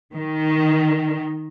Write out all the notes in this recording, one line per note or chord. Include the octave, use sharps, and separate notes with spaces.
D#3